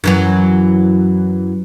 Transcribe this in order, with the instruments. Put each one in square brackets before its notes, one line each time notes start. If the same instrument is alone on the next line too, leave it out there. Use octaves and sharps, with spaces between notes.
[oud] F#2 E3 F#3